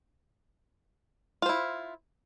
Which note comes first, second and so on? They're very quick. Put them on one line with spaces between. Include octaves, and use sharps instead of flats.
F4 C5 E4